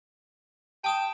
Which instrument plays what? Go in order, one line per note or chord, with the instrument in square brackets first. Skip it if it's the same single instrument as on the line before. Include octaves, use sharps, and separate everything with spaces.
[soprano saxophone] G5 [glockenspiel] A5 D#6 E7